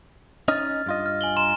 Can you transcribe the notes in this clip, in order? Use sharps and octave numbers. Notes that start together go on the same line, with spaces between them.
C#4 D#4 D#5 F6 A6
G2 F4 D#5
F6
G#5 F#7 G7
A#5 C6 E7